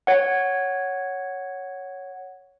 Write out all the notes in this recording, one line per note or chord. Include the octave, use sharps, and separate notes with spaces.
C#5 F#5